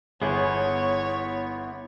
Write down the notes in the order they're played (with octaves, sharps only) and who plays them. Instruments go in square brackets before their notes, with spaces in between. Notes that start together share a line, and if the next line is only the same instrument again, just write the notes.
[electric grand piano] G1 G#4 [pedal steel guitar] B3 E4 [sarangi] C#5